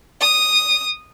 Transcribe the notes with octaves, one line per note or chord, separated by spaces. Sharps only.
D#6